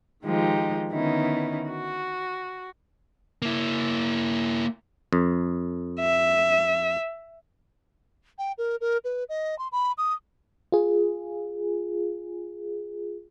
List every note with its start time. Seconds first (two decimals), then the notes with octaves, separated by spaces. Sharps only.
0.23 D#3 F3 G#3 D#4 G4
0.91 D3 D#3 B3 C#4 D#4 E4
1.70 F#4
3.42 A#3 E4
5.13 F2
6.00 E5
8.39 G5
8.58 A#4
8.81 A#4
9.04 B4
9.29 D#5
9.59 C6
9.72 B5
9.98 D#6
10.72 F4 G#4